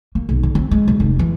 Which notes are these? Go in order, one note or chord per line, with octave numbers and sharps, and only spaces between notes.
A#3
B1
D3
C4
G#3
D#1
F1
E3